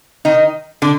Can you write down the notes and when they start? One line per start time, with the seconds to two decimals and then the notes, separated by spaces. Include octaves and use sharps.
0.25 D#3 D#4
0.82 D3 D4